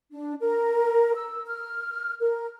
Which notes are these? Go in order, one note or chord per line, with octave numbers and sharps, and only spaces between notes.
D4
A#4
E6
F6
A#4